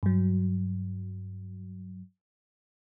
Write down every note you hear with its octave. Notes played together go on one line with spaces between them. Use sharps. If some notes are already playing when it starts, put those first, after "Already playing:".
G2 F#3